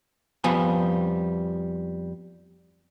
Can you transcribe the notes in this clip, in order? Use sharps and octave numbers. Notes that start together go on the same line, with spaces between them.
F2 F3 G3 B3 G#5